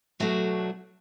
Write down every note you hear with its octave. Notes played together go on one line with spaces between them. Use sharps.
B2 F#3 A3 D4 F#4